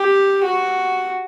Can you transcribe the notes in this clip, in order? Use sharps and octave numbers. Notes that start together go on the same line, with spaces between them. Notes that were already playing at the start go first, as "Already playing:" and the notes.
Already playing: G4
F#4